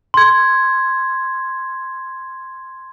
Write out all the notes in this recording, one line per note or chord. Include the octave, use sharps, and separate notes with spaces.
C6 G#6